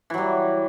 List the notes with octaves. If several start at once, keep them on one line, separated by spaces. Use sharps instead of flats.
E3 F#3 G3